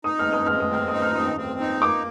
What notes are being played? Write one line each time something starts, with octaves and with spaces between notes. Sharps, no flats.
D#4 D#6
F6
G#3
D#6
G#3 F6
D#6
C4 F6
D#6
D#4
F6
C4 D#6
C4
D#4
A#3 D6